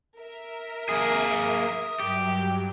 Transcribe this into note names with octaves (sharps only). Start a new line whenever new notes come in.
A#4 E5
A#3 G#4 D#6
G2 F#3 G4